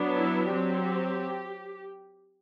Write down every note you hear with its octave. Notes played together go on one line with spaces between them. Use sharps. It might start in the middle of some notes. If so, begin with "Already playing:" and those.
Already playing: F#3 B3 D4
E4
F#3 C4 G4